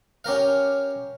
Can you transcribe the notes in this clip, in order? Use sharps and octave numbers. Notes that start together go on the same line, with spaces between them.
C#4 G4 A#4 F5